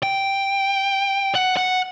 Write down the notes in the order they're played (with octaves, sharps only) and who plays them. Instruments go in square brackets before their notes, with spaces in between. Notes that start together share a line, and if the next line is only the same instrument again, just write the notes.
[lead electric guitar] G5
F#5
F#5